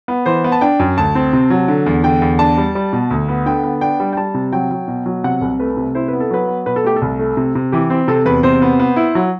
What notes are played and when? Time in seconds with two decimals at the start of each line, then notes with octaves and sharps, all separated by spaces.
0.08 B3
0.26 E3 C5
0.44 B3
0.52 A5
0.61 D4 G5
0.79 F#2
0.97 D2 A5
1.15 C4
1.33 C3
1.50 F#3
1.68 D3
1.86 E2
2.04 D3 G5
2.22 E2
2.39 D4 A5
2.57 G3
2.75 G3
2.93 B2
3.10 D2
3.28 B3
3.46 D3 G5
3.63 B3
3.81 D4 G5
4.00 G3
4.13 G5
4.17 G3 A5
4.34 C3
4.53 F#3 G5
4.71 F#3
4.88 B2
5.06 F#3
5.24 C3 F#5
5.42 C2
5.59 A3 B4
5.77 C3
5.95 E4 C5
6.08 B3 B4
6.20 A4
6.31 F#3 B4
6.48 B3
6.66 B2 B4
6.76 A4
6.84 A3 G4
6.96 A4
7.02 C2
7.19 A3
7.37 C3
7.55 C3
7.72 E3 G4
7.90 C4
8.08 C3 A4
8.26 E2 B4
8.43 C3 C5
8.62 B3
8.80 B3
8.96 E4
9.15 F#3